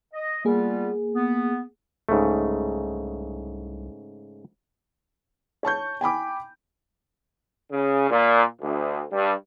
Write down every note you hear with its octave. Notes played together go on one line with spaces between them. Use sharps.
D#5
G3 A#3 B3 F4 G#4
B3
C2 G#2 C#3 A3
C#5 A5 C#6 G6
G5 G#5 B5 D6
C#3
A#2
D2
G2